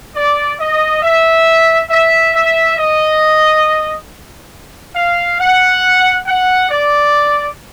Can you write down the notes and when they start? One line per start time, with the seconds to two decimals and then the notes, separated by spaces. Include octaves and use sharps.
0.15 D5
0.60 D#5
1.02 E5
1.90 E5
2.34 E5
2.78 D#5
4.95 F5
5.39 F#5
6.26 F#5
6.69 D5